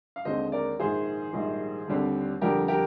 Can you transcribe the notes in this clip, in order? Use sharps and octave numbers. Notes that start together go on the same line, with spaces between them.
F5
D#2 D3 G#3 C4 C5 D#5
A#4 D5
A#1 G#2 D#3 G#4 C5
A#1 G#2 D#3 G3
D#2 D3 G3 C4
F2 D3 G3 G4 A#4
G4 A#4